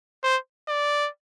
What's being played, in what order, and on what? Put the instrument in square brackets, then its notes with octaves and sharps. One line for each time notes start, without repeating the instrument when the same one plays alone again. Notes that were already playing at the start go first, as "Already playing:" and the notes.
[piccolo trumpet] C5
D5